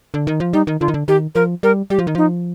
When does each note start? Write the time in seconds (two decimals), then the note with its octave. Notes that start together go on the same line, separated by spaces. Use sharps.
0.14 D3
0.27 D#3
0.40 F3
0.53 G3 D#4
0.67 D#3
0.80 D3 F4
0.88 D#3
0.94 D3
1.08 D#3 G4
1.35 F3 A#4
1.63 G3 A#4
1.90 G3 G4
1.99 F3
2.07 D#3
2.15 F3 D#4